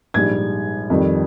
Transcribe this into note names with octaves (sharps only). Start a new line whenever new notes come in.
A#1 G#2 G3 G#6
F2 D#3 G3